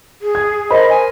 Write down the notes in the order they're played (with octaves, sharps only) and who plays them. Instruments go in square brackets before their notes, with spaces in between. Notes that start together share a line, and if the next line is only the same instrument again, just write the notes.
[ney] G#4
[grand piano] G#6
[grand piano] A#4 C5 B5 [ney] D#5
[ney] G#5